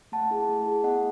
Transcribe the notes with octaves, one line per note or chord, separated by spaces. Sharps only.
A3 F#5 A5
E4 G#4
A3
E4 G#4
B3 D#5 F#5